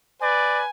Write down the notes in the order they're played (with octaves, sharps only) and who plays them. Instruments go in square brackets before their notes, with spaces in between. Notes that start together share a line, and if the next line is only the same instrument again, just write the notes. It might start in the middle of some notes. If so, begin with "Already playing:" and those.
[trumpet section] B4 D5 [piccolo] G#5